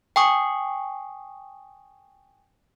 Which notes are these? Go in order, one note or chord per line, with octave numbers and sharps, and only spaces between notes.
G5 G#5 C#6 D#6